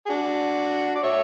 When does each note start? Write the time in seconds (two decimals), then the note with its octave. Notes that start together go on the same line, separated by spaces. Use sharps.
0.06 G#4
0.09 D4 F#4
0.95 D5
1.03 C#5 E5